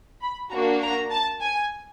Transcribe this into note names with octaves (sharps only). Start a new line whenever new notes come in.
B5
A#3 D4 F#4 A#5
A#5
A5
G#5